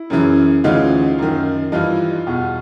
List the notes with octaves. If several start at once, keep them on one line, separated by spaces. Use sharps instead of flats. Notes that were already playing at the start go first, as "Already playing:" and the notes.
Already playing: E4
F#2 C#3 E3
D2 C#3 E3 D#4 F4
F#2 D#3
G2 E3 D#4 F4
E2 B2